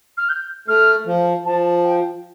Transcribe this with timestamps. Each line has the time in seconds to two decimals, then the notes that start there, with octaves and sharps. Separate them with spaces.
0.17 F6
0.29 G6
0.68 A3 F6
1.06 F3
1.45 F3 A5
1.84 G5